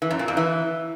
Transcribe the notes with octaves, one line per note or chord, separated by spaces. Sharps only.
E3
F#2
A#2
F2
E3